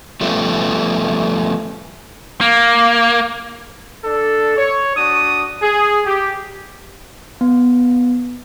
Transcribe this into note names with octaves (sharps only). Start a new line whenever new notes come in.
F3 G3 A3 B3 C#4
A#3
D4 A4
C#5
D4 F#4 D#6
G#4
G4
B3